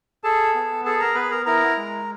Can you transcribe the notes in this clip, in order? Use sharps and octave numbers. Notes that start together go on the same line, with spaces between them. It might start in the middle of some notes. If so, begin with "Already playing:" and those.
G#4 A4 A5
B3
G#4 A4 A5
A#4 A#5
B3 B4 B5
A#4 A#5
E4 A#4 A#5
G#3